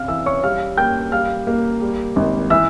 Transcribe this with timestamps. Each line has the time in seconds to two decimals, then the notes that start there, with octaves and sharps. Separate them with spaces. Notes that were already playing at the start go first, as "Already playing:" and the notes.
Already playing: C3 F5 F6
0.08 E3 E5 E6
0.26 C#5 C#6
0.43 G3 F5 F6
0.78 A#3 G5 G6
1.12 G3 F5 F6
1.47 A#3
1.81 G3
2.16 G#1
2.50 E3 E5 E6